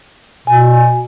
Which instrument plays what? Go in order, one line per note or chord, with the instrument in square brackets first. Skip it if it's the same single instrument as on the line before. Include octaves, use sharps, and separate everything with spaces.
[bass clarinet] B2 [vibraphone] G#5